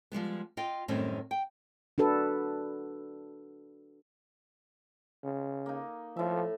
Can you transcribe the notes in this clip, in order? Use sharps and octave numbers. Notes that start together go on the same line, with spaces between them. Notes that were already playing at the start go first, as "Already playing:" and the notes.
F3 G3 G#3 B3
F4 D#5 G5
F#2 A2 D#3 G3 C4 C#4
G5
D4 F#4 A4 B4
C#3
A#3 D#4
A2 F3 E5